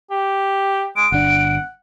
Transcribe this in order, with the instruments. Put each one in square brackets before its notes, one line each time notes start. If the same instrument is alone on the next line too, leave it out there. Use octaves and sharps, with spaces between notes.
[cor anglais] G4
[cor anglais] G#3 [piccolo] D7
[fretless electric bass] G1 D4 [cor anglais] F#5